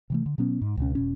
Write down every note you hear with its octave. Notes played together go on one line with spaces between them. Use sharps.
C3 E3 A3
D3
B2 F#3 B3 C#4
G#2
C#2 B2 C#4
E1 B2 C#4